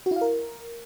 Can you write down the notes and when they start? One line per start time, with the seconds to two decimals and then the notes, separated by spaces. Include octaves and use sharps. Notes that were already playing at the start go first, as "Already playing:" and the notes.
0.06 F#4
0.11 E4
0.16 F5
0.21 A#4